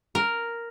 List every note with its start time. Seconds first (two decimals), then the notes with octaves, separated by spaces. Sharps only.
0.15 A#4